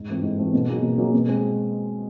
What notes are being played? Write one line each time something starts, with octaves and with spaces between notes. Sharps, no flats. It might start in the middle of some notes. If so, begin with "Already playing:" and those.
Already playing: G#2
E3 A3 C4 F4
G#2
E3 A3 C4 F4
B2
F#3 A#3 D#4 G#4
B2
F#3 A#3 D#4 G#4
B2
G#3 C4